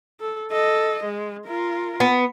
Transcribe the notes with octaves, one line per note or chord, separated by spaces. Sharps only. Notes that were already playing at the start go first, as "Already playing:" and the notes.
A4
A4 D#5
G#3
F4 A#4
B3